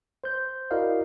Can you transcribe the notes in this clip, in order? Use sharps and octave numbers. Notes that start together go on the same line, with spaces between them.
C5 G6
E4 F#4 A#4 D5 D#5 F5